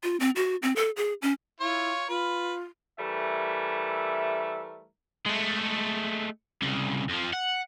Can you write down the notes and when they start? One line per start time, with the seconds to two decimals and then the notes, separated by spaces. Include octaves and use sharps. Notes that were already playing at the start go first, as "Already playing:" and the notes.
0.03 F4
0.20 C4
0.36 F#4
0.62 C4
0.76 A4
0.96 G#4
1.22 C#4
1.60 E4 F4 C#5
2.09 F4 B4
2.99 E3 G3 A3 A#4 E5
5.26 G#3 A3
6.62 C2 C#3
7.09 F2 F3
7.33 F#5